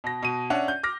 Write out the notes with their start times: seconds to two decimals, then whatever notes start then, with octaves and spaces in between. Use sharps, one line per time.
0.04 B2 A#6
0.22 B2 D#7
0.50 C#4 D4 E5 F#5
0.68 G6
0.83 D6 F6 A#6